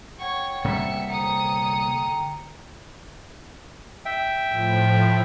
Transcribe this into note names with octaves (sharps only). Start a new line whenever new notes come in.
C#5 F#5 G5 C#6
C3 G3 A#3 E5 C#7
D3 G5 A#5 D#6 C#7
E5 G5
A2 F3